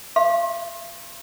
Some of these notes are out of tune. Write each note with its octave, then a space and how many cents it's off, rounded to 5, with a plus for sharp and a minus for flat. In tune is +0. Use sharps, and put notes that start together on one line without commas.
F5 -35 C6 +35